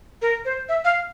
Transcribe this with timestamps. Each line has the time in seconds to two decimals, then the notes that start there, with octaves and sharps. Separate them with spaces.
0.22 A#4
0.45 C5
0.69 E5
0.85 F5